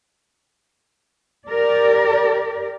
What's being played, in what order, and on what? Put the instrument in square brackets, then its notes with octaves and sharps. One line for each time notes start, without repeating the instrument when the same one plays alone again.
[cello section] G4 A#4 D5